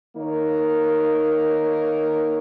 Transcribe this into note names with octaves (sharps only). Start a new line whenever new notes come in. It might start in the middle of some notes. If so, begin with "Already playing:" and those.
D#3 A#3 D#4 A#4 C#5